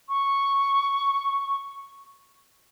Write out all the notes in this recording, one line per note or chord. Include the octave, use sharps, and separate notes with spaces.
C#6